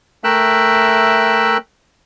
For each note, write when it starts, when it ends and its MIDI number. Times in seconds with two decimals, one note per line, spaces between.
0.24 1.57 57
0.24 1.57 70
0.24 1.57 76
0.24 1.57 79
0.24 1.57 88
0.24 1.57 90